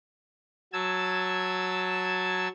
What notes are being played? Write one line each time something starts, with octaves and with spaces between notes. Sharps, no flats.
F#3 A5 E6 G#6